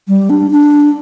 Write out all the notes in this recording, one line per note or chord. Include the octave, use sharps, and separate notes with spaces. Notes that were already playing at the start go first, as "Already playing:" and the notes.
G3
D4
D4